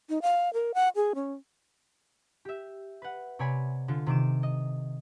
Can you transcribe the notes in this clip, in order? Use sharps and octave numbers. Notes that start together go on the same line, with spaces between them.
D#4
F5
A#4
F#5
G#4
C#4
G4 E5
B4 F#5
C3 C#5 D5 G#5 B5
D3 F4 A4
C3 D#3 D6 E7
D#5